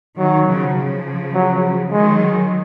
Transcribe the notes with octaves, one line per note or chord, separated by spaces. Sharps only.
D#3 F#3
C#3 F3
C#3 F3
F#3
D#3 F#3 G#3